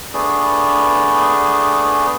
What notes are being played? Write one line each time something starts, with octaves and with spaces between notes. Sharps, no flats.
A3 B3 D4 G#4